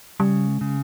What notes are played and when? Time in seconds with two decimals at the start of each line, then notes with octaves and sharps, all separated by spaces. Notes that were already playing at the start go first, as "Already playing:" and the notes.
0.20 C#3 G3
0.48 G#3
0.61 C#3